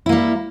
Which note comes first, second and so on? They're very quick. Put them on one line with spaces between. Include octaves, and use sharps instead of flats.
E4 A#3 G3